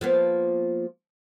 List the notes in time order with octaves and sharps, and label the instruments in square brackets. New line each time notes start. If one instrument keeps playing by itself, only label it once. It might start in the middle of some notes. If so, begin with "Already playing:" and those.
[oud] F3 A#3 B3